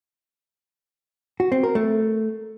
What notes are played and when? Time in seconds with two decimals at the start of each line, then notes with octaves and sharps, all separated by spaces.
1.40 F#4
1.52 C4
1.63 A#4
1.75 A3